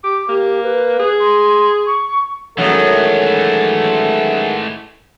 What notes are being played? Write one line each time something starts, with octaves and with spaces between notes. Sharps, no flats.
G4 D6
A#3 G4
B4
G#4
C6
C#6
F#2 D#3 E3 F#3 G#3 A3 A4 F#5